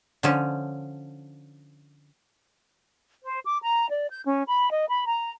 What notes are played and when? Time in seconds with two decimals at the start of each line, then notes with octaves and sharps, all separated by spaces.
0.23 D3 F3 C#4
3.22 C5
3.45 D6
3.62 A#5
3.89 D5
4.10 G6
4.26 C#4
4.48 B5
4.70 D#5
4.89 B5
5.07 A#5